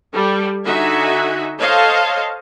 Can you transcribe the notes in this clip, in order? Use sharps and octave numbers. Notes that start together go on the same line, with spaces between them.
G3 A4
D3 D#4 F#4 E5 G#5
A4 C5 C#5 D#5 F5 A5